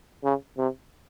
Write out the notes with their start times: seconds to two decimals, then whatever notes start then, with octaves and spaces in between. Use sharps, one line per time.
0.24 C#3
0.58 C3